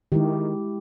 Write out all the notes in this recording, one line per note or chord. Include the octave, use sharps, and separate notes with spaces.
D#3 G#3 E4 G4